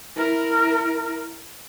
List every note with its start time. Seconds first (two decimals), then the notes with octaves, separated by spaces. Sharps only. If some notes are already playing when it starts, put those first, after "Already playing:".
0.17 E4 A#4